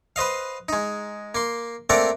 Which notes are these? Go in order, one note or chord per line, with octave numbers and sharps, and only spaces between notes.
B4 C5 D#5 F5
G#3 D#4
A#3 C6
A3 A#3 C4 A#4 D5 F#5